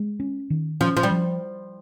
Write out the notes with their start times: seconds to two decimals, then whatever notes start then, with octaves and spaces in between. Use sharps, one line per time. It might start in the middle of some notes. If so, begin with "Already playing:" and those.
Already playing: G#3
0.20 C#4
0.50 D#3
0.81 F3 C#4
0.97 F3
1.03 G3
1.11 F3